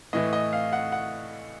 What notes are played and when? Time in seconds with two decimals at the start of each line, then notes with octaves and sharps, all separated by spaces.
0.13 A2 E3 A3 D#5
0.33 D#5
0.53 F5
0.73 F#5
0.92 F#5